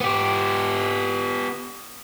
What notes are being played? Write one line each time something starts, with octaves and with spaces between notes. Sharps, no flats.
B3 G4